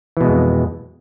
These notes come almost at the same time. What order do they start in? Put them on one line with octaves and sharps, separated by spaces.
E3 B2 G#3 F2